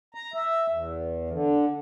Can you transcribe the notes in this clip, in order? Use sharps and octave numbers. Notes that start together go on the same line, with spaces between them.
A#5
E5
E2
D3